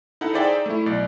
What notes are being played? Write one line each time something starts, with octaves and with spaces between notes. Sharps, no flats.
D#4 E4 A4 F#5
D#4 G#4 C5 D5 E5 G5
A3 E4
B1 D5